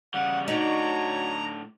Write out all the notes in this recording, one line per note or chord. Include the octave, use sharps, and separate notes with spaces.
C#3 G3 F#5
A2 D4 D#4 F#4 C#5 A#5